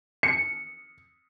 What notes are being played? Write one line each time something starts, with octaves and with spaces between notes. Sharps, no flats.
C#7